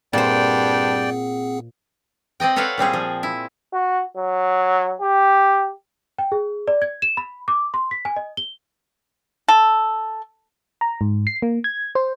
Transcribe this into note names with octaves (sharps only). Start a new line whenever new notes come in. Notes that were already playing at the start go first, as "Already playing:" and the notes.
G2 A#2 C4 G#4 C5 D5 F#5 G5
C4 D5 D#5 G5
A4 B4 C#5 D5 F5 F#5
A#2 G3 C4 G#4
F3
E4
F#4
F#3
G4
G5
G#4
D5
G#6
E7
B5
D6
C6
B6
G#5
D#5
G7
A4
A#5
G#2
C7
A#3
G#6
C5